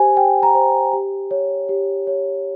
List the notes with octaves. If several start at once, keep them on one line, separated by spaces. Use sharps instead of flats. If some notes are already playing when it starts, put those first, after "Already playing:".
Already playing: G4 C5 G#5
G4 G5
A#5
C5
G4
C#5
G4
C#5